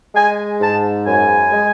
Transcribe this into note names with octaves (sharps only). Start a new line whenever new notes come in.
G#3 G#5
G#2 A5
F#2 G#5
G#3